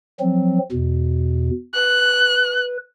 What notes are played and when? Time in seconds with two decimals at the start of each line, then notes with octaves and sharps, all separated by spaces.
0.20 F3 F#3 C4
0.72 E2 B2
1.74 B4 F#6